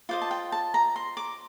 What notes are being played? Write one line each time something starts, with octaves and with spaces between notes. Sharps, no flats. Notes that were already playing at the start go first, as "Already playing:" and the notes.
F4 C5 D#5 D6
A5
G5
A5
A#5
C6
D6